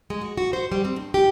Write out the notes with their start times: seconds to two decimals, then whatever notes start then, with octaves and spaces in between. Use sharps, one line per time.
0.10 G#3
0.21 F#4
0.37 F#4
0.53 C5
0.72 G3
0.85 C4
0.96 G2
1.14 G4